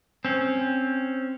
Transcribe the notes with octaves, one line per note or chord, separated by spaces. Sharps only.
C4 C#4